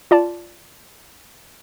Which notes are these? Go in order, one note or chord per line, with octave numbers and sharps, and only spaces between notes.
F4 D5 A5